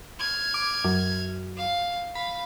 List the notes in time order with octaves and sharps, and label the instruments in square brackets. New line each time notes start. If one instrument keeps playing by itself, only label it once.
[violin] F6 G#6
[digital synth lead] D6
F#2
[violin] F5
[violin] F5 [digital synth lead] B5